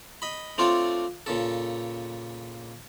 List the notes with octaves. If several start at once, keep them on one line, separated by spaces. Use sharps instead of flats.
D#5 B5
A3 C4 D4 F4 C#5 D5
A#2 C#3 A4